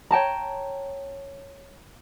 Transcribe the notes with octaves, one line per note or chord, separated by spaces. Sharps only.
C#5 G5 A5 A#5